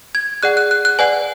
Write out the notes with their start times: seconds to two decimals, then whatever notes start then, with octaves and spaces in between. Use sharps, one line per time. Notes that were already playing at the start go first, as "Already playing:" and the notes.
0.15 G#6
0.43 G#4 D5 F#5 F#6
0.57 F#6
0.71 F#6
0.85 F#6
0.99 B4 D5 F#5 G#5